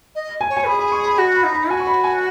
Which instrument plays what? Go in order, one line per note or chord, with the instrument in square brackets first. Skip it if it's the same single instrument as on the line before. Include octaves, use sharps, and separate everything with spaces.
[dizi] D#5
[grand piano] G#5
[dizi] C#5
[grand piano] G#5
[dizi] G#4 [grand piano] B5
[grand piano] B5
C#6
B5
[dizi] F#4
[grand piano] B5
[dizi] D#4
[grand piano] B5
[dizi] F#4 [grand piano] G#5
[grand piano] C#6
B5
G#5